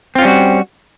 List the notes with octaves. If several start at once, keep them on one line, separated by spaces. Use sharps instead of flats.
G3 C4 C#4 F4 F#4